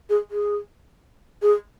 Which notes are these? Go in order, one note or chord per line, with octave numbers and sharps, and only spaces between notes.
G#4
G#4
G#4